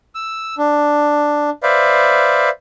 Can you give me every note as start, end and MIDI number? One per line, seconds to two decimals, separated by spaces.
0.15 0.55 88
0.58 1.50 62
1.63 2.49 71
1.63 2.49 72
1.63 2.49 74
1.63 2.49 76
1.63 2.49 77